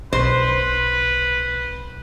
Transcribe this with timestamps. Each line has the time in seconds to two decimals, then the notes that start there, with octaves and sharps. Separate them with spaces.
0.13 B1 B4 C5